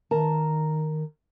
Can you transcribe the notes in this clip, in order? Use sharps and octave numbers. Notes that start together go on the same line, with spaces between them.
D#3 A#4 A5 A#5